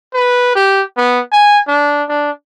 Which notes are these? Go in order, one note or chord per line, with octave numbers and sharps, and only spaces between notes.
B4
G4
B3
G#5
D4
D4